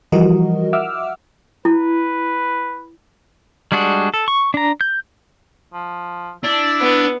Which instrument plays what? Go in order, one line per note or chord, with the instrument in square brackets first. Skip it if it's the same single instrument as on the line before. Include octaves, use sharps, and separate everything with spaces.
[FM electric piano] E3 F3 G3 F#4 A#4 D#5
E5 F#5 D6 E6 F6
[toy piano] E4 [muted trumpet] B4
[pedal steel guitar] G3 G#3 D4 F#4 G#4
A4
C#6
D4 A#5
G6
[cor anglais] F3
[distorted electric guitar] D4 [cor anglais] E4
[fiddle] B3